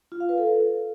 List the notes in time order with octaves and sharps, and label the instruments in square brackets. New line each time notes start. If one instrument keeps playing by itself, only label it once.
[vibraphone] F4
F5
B4
A4